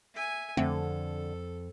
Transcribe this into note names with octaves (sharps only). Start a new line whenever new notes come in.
E5 G#5
F2 D3 A3 C4 A4 F#5